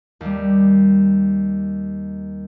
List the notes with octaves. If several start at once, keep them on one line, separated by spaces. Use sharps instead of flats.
D#2 G3